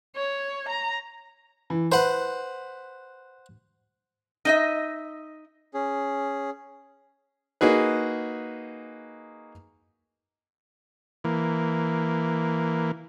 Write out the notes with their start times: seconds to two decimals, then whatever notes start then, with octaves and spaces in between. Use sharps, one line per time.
0.16 C#5
0.69 A#5
1.70 E3
1.92 B4 C5 F#5
4.45 D#4 D#5 E5
5.74 C#4 G#4
7.61 A#3 D#4 F#4 G#4 B4
11.24 E3 A#3